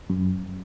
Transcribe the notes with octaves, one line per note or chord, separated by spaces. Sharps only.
F#2